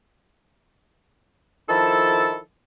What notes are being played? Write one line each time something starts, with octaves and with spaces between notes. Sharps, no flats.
D#3 F3 E4 A4